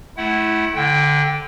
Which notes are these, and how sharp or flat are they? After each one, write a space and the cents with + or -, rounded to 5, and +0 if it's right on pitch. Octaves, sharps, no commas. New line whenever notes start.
A3 -25 E4 +0 F#5 +25
D3 -10 G5 +0